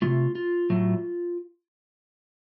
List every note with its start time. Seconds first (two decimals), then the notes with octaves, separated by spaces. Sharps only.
0.02 D#3 A3 F4
0.06 C3
0.35 F4
0.70 A2 F#3 A3